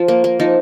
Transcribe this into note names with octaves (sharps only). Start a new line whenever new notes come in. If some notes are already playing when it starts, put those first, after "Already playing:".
Already playing: F3
A#3
A#3
F3 D#4